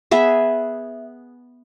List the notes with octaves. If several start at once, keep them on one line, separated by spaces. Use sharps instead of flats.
B3 G#4 E5